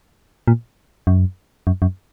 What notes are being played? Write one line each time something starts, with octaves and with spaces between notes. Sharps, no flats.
A#2
F#2
F#2
F#2